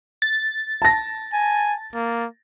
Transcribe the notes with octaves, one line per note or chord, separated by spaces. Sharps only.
A6
A5 A#6
G#5
A#3